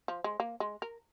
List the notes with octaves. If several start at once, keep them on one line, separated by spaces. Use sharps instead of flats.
F3
G#3
A#3
G#3
A#4